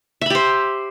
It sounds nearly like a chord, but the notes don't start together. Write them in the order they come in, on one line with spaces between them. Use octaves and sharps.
E5 B5 G4 C5